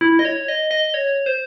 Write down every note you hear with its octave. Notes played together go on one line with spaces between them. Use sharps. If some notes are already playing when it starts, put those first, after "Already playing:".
E4
D#5
C#5
D#5
D#5
C#5
C5